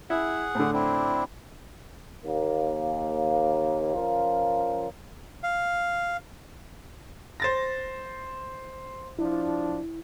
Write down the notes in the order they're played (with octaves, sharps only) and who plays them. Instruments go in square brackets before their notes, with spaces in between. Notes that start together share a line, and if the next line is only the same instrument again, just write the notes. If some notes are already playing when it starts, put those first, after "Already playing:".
[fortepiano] E4 [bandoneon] G#4 F#5
[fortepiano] A2 D3
[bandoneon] C4 D4 E4
[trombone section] D#2 A#3
F3 C#4 F4 A#4
[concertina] F5
[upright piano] C5 A6 A#6
[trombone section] F3 D4 [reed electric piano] E4